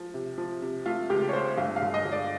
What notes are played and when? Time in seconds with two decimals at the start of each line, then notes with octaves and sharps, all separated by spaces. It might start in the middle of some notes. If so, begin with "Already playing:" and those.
Already playing: F3
0.14 C3
0.38 F3
0.62 C3
0.86 A3 F4
1.10 C#2 G4
1.29 C#5
1.33 A3 C5
1.57 G1 F5
1.76 F5
1.82 G1
1.94 D#5
2.05 G1
2.12 D5